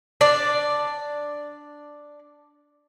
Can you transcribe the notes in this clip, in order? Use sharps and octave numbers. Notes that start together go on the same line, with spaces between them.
D4 D5